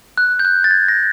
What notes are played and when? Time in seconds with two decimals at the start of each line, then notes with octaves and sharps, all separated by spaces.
0.18 F#6
0.39 G6
0.45 F#6
0.64 A6
0.71 G#6
0.88 A#6